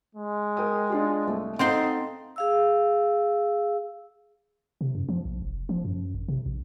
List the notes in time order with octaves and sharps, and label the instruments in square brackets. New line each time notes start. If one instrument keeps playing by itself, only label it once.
[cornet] G#3
[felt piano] A#4 G5 D#6
D4 F4 G4
C2 A3
[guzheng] C4 C5 C6 [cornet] D#4 [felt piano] A4 F5 F#5
[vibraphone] G#4 F5 E6
[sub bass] C3
F#2
F3
A#1
F1
F3
F#2
G#1
C3
A#1